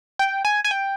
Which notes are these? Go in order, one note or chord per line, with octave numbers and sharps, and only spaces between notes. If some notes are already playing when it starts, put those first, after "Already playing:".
G5
G#5
G#5
G5